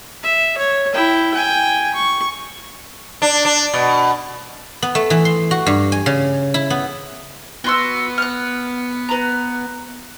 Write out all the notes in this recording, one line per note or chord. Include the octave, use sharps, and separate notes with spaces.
E5
C#5
E4 G5
G5 G#5
C#6
D4
D4
B2
B3
A3
E3
C6
F#4
G2
G#5
C#3
E4
B3
B3 F#4 C6 E6
F6 F#6
B4 A#5